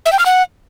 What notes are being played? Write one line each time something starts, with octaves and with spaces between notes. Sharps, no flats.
E5
G5
F6
F#5